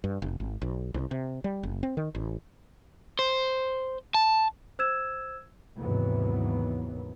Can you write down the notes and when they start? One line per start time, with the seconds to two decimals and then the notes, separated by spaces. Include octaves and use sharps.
0.04 G2
0.22 F1
0.40 G#1
0.62 B1
0.94 C2
1.11 C3
1.44 G3
1.63 F#1
1.83 C4
1.97 D#3
2.15 A1
3.19 C5
4.15 A5
4.79 C5 E6 G#6 E7
5.80 D#2 G#2 C3 E3 F#3 B3